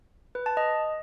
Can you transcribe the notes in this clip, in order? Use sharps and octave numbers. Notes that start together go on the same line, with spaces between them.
B4
A5
D#5